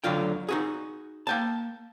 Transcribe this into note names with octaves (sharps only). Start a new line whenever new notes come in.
D2 D3 F#3 F4 G5
D#4 F#4 G#4
A#3 G5 A5